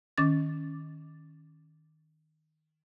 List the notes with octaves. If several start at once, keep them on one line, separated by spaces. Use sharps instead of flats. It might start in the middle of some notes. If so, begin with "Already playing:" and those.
D#3 C#4 D6 A6